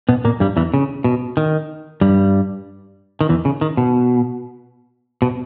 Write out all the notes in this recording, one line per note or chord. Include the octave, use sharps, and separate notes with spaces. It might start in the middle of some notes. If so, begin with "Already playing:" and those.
B2 B3
A#2 A#3
G2 G3
E2 E3
C#3
B2
D#3
G2 G3
D#3
E2 E3
C#3
D#3
B2
B2